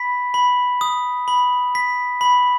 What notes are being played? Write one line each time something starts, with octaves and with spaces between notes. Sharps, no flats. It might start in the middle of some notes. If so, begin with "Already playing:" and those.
Already playing: B5 B6
B5
D#6
B5
B6
B5